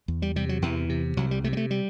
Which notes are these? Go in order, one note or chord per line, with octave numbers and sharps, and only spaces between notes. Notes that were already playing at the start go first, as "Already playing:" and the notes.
E2
G3
C3 G3
F#3
E2 E3
C3
C2 F#3
G3
C3 A3
G3
A3
G3